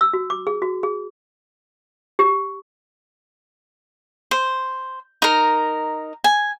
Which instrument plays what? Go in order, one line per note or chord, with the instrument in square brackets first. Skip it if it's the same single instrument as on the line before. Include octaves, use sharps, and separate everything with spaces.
[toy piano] E6
F#4
D6
G#4
F#4
G#4
G4
[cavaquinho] C5
D#4 A#4
G#5